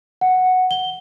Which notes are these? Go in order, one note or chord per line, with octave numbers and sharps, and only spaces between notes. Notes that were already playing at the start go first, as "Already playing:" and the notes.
F#5
G7